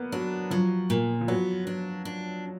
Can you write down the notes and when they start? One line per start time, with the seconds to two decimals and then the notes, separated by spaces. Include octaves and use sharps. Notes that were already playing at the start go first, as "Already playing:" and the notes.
Already playing: A#3 B3
0.12 F#3 D4
0.51 F3 F#3
0.90 A#2
1.21 F3
1.28 F#3 B3
1.67 D4
2.05 D4